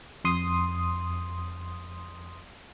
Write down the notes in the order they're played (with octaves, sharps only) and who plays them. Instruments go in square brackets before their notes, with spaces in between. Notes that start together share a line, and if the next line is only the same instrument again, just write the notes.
[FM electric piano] F2 C6 D#6